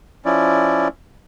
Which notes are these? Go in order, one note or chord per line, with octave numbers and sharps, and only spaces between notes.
F3 C#4 E4 D5